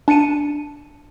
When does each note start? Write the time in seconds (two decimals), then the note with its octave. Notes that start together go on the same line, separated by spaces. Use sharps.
0.08 D4 A5 C#7 D#7 E7